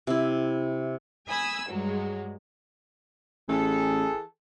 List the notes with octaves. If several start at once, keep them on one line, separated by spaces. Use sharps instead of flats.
C3 E4
G#5 B5 D#6 E6
G2 F#3 G#3
A1 E3 G#4 A4